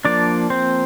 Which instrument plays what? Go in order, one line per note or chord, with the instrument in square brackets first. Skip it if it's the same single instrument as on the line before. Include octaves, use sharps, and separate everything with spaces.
[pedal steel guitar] F3 A#3 D4 D5
C4 C5